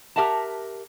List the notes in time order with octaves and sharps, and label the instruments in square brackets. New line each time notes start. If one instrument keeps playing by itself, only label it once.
[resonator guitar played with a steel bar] G4 A#4 E5 F#5 A5